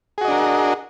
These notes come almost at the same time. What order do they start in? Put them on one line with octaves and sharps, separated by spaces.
G#4 F#4 D#5 D4 A#4